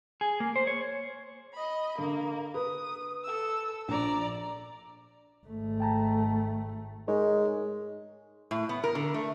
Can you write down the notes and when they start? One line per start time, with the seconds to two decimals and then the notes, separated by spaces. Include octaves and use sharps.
0.21 G#4
0.40 A#3
0.56 C5
0.67 C#5
1.53 D#5 B5
1.98 D3 A#3
2.54 B4 D#6
3.23 A4 E6
3.88 A#1 D5 A#5
5.46 G#1 A3
5.80 G5 A5 A#5
7.08 G#3 D#4 A#4 C#5
8.51 A2
8.69 B3
8.84 A#4
8.95 D3
9.14 A3